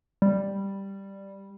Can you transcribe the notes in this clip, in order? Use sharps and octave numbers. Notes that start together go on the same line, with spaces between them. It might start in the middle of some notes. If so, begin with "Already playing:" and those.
G3